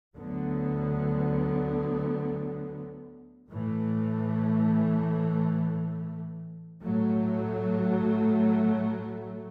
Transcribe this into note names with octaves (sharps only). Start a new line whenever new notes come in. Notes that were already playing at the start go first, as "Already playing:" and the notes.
D2 D3 F#3 B3
A2 E3 A3
A2 F#3 A3